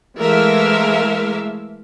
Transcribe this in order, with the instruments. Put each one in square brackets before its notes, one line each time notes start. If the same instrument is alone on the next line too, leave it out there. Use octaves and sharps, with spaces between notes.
[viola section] E3 G#3 A3 A#4 E5 F5